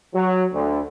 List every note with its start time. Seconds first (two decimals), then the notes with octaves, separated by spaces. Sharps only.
0.14 F#3
0.53 D2